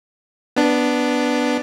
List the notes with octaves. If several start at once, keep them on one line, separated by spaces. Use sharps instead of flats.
B3 D4